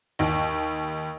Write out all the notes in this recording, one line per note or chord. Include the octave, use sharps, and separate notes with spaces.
D#2